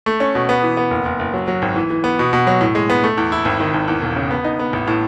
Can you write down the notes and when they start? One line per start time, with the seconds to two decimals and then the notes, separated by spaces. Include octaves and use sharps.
0.06 A3
0.20 C#4
0.35 B2
0.49 B3
0.62 E3
0.77 B3
0.91 F#1
1.05 F#1
1.19 F#1
1.33 F#3
1.48 F#3
1.62 G#1
1.76 E3
1.90 E3
2.04 B3
2.19 B2
2.33 B2
2.47 F#3
2.61 A2
2.75 G#3
2.90 B3
3.04 A3
3.17 E2
3.32 E4
3.45 G#1
3.60 D#3
3.74 G#1
3.88 E2
4.02 E1
4.16 C#3
4.31 B3
4.44 D#4
4.59 B3
4.73 A1
4.88 A2